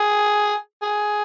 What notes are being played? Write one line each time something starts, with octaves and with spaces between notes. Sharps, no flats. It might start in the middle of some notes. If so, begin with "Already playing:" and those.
Already playing: G#4
G#4